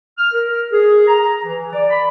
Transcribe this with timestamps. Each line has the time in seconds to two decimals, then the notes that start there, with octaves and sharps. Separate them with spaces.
0.17 F6
0.33 A#4
0.72 G#4
1.08 A#5
1.44 E3
1.73 D5
1.90 B5